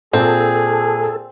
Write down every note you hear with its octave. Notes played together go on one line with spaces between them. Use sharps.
A#2 C4 G#4 A4